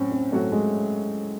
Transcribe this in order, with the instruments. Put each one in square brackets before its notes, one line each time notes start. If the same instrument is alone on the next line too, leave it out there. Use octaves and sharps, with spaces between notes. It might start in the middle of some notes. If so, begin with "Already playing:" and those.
Already playing: [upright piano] A2 F#3 [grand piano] C4 C#4
[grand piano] C4
[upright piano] A2 F#3 C#4 F#4 [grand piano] A3
[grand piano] G#3